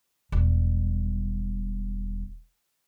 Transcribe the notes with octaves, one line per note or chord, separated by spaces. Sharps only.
E1 G3